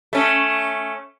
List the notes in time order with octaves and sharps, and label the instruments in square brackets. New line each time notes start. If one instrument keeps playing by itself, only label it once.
[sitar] A3 C#4